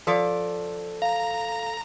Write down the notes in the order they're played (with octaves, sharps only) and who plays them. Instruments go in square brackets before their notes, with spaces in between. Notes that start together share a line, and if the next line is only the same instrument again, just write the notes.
[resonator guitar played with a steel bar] F3 D5 [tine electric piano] A4
[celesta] F5 [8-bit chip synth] A#5